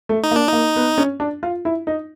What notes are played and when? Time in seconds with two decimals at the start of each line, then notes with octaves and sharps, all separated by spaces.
0.09 A3
0.24 D#4
0.31 A#3
0.36 D4
0.48 A#3 D#4
0.76 B3
0.98 C#4
1.20 D4
1.43 F4
1.65 E4
1.87 D#4